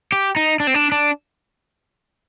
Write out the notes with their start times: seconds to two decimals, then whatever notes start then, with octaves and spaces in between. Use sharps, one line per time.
0.12 G4
0.36 D#4
0.60 D4
0.67 C4
0.74 D4
0.92 D4